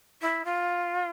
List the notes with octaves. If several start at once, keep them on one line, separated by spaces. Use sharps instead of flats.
E4
F4